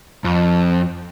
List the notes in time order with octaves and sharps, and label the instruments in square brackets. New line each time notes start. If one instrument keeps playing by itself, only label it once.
[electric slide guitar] F2